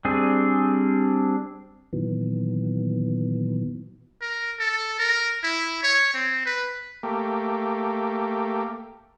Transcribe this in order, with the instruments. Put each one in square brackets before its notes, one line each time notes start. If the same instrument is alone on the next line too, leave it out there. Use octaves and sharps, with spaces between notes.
[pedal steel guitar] G3 C4 D4 G#4
[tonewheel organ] A#2 D#3 E3 F#3 B3
[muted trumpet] A#4
A4
A#4
E4
C#5
C4
B4
[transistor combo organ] A3 A#3 G4